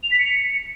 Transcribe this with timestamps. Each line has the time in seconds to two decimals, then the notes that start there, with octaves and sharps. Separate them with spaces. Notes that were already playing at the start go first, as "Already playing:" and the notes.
0.03 F7
0.11 B6
0.19 C#7